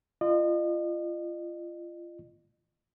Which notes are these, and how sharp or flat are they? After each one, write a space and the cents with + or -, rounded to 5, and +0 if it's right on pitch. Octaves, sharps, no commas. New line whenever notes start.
F4 -25 D#5 -40